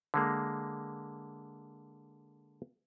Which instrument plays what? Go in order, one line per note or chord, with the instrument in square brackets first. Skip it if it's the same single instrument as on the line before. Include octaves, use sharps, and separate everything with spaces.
[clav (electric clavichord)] D3 G#3 A#3